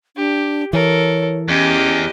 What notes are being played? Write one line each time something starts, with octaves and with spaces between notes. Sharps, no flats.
D4 G4
E3 A4 A#4 C#5
E2 C#4 G4 D#5